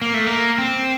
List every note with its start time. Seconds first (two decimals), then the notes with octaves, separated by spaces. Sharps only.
0.02 A#3
0.14 A3
0.26 A#3
0.58 C4